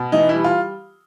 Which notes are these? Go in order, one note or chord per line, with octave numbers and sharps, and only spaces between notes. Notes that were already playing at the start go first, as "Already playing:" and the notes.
Already playing: B2
E3 D#4
G3 E4
F4